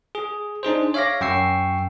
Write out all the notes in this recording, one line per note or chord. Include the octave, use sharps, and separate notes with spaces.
G#4
D4 D#4 G#4 C5
C#5 E5 F5 D6 A#6
F#2 G5 C#6 E6 C7